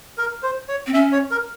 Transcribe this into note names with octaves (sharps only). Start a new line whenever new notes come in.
A#4
C5
C#5
C4
C#4 E5
C#5
A#4